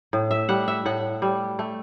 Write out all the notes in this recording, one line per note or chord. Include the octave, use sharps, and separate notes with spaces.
A2
E5
G3 F#5
E5
A2 F#5
G3
A3